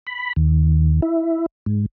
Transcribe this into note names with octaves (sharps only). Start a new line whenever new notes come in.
B5
D#2
E4
G#2